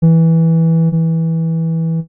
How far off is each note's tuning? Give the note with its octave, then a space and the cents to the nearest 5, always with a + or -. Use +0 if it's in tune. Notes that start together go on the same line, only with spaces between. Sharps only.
E3 -10
E3 -15